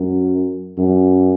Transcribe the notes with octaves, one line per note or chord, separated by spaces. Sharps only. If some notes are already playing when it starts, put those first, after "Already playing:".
Already playing: F#2
F#2